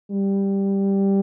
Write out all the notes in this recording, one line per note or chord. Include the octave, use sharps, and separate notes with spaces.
G3